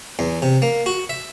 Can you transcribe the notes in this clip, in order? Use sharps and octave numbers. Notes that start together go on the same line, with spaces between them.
E2
C3
A#3
F#4
E5